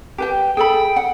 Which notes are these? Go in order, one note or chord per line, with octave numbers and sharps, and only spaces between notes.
G4 B4 G5
G#4 A4 G5 B5
F#5